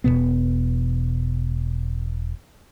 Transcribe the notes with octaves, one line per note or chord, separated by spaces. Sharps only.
E1 F2 B2 B3